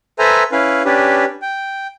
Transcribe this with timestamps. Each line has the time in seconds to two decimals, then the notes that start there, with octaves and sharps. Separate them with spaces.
0.19 A4 B4 C5 E5 G#5 A#5
0.52 C#4 E4 B4 F5
0.85 C#4 D4 G4 B4
1.42 G5